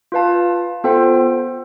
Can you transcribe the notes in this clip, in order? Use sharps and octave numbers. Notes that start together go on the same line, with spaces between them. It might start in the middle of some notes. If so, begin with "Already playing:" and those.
F4 B4 F5 A5
B3 F4 A4 C5 G5